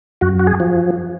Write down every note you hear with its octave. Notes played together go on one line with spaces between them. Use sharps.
F#2 F#4
F#4
G#4
F3